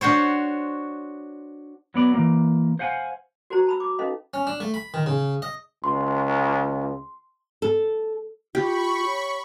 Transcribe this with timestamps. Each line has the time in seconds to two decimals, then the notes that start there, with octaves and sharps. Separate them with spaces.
0.01 D4 F#4 C5 C#5
1.94 F#3 B3 D5
2.14 E3 A#3
2.79 C5 F5 F#5 G#5
3.50 F#4 A#4 C5 A#5
3.67 A5 B5 E6
3.80 D6
3.99 C#4 D#4 A4 B4 D#5 F5
4.34 C#4
4.47 D4
4.60 A3
4.74 B5
4.94 D#3
5.06 C#3
5.42 D#5
5.84 C#2 C6
7.62 A4
8.55 F4 G4 B5 C#6
9.06 C#5